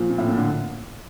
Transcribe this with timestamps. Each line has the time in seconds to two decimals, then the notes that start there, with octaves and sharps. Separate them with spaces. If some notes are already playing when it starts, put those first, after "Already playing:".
Already playing: A#2 F3
0.10 A#2
0.18 A2
0.28 A#2
0.37 D3